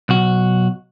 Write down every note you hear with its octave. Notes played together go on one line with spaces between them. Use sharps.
B1 F#4